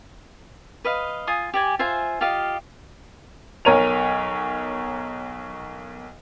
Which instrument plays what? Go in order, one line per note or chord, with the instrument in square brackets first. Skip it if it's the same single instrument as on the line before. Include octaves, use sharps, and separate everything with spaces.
[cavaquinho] B4 D#5 F5
F4 G#5 D#6
G4 D5 G#5
F4 C5 E5 G#5
F4 G4 D#5 F5
[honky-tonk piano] B1 A#4 C#5 D#7 F7